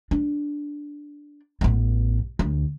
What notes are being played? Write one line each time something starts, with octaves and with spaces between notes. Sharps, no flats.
D4
A1 B3
D2